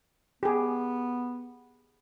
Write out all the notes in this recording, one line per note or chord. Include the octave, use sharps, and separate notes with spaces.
B3 G4 G#4